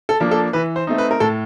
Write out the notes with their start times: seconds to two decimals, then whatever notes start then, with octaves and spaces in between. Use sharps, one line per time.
0.09 A4
0.20 F3 A#3 D4
0.31 A4
0.53 E3 B4
0.76 C5
0.87 A3 C4 D#4
0.98 B4
1.11 A#4
1.20 A2 A4